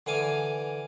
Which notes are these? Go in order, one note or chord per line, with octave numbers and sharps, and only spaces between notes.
D3 E3 F5 G#5 D6 D#6